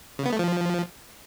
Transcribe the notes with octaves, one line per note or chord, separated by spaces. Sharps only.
C#3
B3
A3
F3